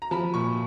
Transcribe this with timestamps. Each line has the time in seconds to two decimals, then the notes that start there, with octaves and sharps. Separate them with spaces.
0.02 A#5
0.11 F3 A5 B5
0.34 A#2 B5 C#6